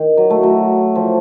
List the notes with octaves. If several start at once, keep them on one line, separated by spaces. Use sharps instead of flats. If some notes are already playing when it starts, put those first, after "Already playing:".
Already playing: D#3
F#3
A3
F#3
F3